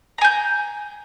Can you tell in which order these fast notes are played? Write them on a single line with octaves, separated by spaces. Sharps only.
A#5 G#5 G6